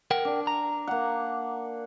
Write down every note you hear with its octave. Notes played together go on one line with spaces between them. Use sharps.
A#4 F#5 G5
D4
A#5
A#3 F#5